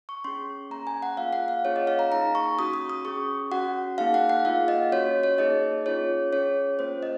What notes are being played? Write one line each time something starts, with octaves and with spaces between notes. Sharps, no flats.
C#6
C#4 G#4 C6
A#3 C#4 G#4 A#5
G#5
F#5
A#3 F4 G#4 F5
F#5
F5
A#3 C#4 F4 G#4 C#5
D#5
F5
A#5
A#3 D#4 G#4 A#5
C#6
C#4 F#4 D#6
D#6
D#6
C#4 G#4 C#6
C#4 F#4 F#5
A#3 D#4 G#4 F5
F#5
F#5
A#3 F4 G#4 F5
D#5
C#4 F#4 C#5
C#5
A#3 D#4 G#4 D#5
C#4 F4 G#4 C#5
C#4 G#4 C#5
A#3 C#4 F4 C5
D#5